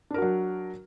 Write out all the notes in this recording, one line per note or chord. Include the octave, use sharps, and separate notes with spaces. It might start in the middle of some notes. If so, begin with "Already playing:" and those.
F#3 D4 F#4 A#4